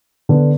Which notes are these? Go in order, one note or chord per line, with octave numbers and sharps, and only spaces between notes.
D3 B3 D4